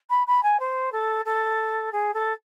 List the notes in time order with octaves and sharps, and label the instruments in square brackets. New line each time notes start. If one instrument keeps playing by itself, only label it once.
[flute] B5
B5
G#5
C5
A4
A4
G#4
A4